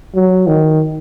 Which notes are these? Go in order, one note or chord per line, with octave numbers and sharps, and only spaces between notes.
F#3
D#3